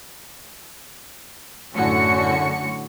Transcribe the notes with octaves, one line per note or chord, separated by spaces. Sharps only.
F#2 A2 D3 C#4 F#4 C#7